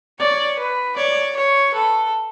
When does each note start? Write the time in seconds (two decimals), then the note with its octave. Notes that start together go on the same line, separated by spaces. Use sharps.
0.20 C#5 D5
0.59 B4
0.97 C#5 D5
1.36 C#5
1.74 A4 B4